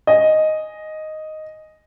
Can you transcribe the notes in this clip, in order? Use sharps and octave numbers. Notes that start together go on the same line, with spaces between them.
D#5 G#5